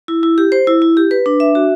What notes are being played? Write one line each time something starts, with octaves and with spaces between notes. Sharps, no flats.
E4
E4
G4
C5
E4
E4
G4
B4
D4
E5
F#4